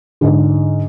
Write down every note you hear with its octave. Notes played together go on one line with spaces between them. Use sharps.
G#2 D3